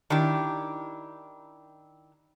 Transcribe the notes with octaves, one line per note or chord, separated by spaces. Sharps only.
D#3 D4 E4 G4